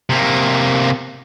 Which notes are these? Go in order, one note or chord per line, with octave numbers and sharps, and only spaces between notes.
C3 A#3